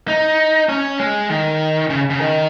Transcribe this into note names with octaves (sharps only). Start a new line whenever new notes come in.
D#4
C#4
G#3
D#3
C#3
C#3
D#3